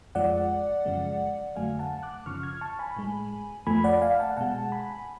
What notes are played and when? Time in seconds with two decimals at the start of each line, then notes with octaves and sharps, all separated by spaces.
0.15 F2 F3 G#3 D5 F#5
0.85 F#2 C#3 F3 G#3
1.56 F2 D3 F#3 A3 F5 G#5
1.79 F#5 A5
2.03 D6 F#6
2.26 F#2 C#3 F3 C#6 F6
2.43 F6 G#6
2.61 A5 C#6
2.79 G#5 B5
2.97 A2 G#3
3.67 F2 F3 A3 G#5 B5
3.84 D5 F#5
4.01 F5 G#5
4.19 F#5 A5
4.37 B2 G#3 F#5 A5
4.72 G#5 B5